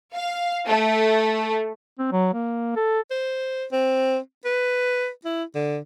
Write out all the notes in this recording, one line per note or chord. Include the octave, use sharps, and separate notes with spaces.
F5
A3
C4
F#3
A#3
A4
C5
C4
B4
E4
D3